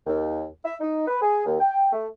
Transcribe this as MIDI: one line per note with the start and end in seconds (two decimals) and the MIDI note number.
0.07 0.45 39
0.65 0.76 76
0.80 1.07 63
1.07 1.17 71
1.22 1.44 68
1.46 1.57 39
1.60 1.93 79
1.93 2.07 57